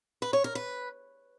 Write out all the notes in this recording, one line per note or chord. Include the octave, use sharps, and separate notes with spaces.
B4
C#5
A#4
B4